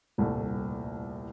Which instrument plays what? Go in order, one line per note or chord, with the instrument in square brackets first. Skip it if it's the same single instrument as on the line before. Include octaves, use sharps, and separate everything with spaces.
[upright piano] D#1 C2 A2 A3